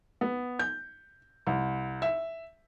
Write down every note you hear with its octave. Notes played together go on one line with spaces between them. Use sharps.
B3
G6
C2
E5